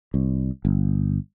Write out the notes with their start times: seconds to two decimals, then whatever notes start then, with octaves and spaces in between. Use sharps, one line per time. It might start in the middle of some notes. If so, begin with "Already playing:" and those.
0.14 C2
0.65 G1